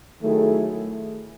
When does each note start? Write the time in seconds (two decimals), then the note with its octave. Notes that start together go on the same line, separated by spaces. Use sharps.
0.19 D#3 F#3 A3 E4 G#4